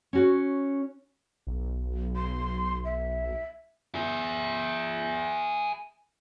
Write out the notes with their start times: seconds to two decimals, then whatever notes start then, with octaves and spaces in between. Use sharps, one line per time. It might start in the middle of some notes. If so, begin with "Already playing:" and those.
0.13 C#4 F#4 C#5
1.47 B1
2.16 C6
2.85 E5
3.95 G#4 E5